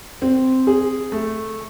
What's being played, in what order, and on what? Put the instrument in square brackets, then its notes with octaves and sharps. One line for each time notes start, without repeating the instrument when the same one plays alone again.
[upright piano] C4
G#4
A3